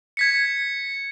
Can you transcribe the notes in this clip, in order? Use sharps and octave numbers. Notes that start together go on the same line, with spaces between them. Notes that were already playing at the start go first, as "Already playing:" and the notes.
G#6 B6 C#7